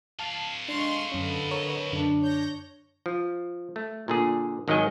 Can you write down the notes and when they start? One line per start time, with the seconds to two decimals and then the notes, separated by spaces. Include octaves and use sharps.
0.19 A4 F5 A5 C7
0.68 G#3 D4 C6 C#6 F6
1.12 F#2 D3 C#4 B4 D#5
1.51 A#4 C#5 C#6
1.92 F#2 D3 D4
2.22 C#5 G6 A#6
3.06 F3
3.76 A3
4.08 A#2 D3 G#4
4.68 G#1 D#3 F#3 G#3 D#5 G#5